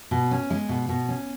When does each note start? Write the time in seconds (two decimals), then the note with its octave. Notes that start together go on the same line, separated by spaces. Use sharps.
0.11 B2
0.31 C#4
0.50 G#3
0.69 B2
0.89 B2
1.08 C#4